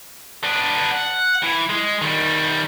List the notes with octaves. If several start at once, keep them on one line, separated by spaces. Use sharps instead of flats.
B3 D4
F#5
E3
G#3
D#3 G3